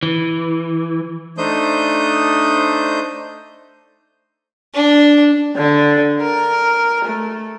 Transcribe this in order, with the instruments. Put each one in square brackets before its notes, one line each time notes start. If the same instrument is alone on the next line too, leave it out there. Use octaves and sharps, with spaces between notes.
[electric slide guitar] E3
[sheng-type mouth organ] A3 D4 D#4 C5 D#6 G6
[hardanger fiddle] D4
[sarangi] D3
A#4
A3